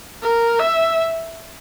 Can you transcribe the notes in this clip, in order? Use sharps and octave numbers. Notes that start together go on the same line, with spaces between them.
A#4
E5